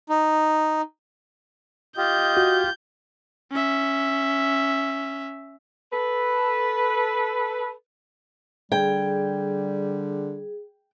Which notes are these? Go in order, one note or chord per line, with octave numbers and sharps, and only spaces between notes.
D#4
F4 G4 D#5 G6
F#4
C#4 E5
A4 B4
D3 G3 G#4 G5